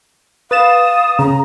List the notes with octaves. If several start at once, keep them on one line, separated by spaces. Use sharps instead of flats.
B4 F5 D#6 A6 E7
C#3 A#5